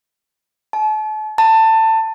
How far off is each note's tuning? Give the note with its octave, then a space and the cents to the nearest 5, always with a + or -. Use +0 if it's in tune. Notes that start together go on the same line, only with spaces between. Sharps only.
A5 -40
A5 +20